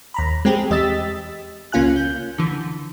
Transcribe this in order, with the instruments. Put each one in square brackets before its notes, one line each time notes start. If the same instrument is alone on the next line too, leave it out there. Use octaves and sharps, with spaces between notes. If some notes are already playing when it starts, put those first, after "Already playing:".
[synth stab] D#2 A#5 B5
G#3 C4 G4 G#4
E2 G4 D#5 E6 A6 B6
C#2 A#3 C#4 F4 G#5 F#6
G6
D3 E3